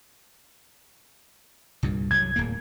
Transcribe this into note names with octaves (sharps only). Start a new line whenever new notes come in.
C2 G2 A#2
C2 F#3 G#6
D1 E2 A#3